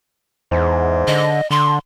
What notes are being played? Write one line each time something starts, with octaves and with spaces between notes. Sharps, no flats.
E2 G#2
D3 D#5
D3 C6